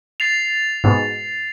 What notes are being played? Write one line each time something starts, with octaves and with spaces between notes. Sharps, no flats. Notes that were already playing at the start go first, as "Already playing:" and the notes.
A6 C7 F7
G#2 B2